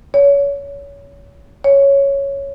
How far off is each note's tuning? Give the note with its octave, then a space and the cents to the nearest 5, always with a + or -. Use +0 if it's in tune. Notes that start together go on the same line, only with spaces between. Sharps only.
C#5 +25
C#5 +0